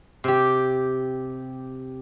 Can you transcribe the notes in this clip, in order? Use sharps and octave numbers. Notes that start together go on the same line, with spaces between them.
C3 G4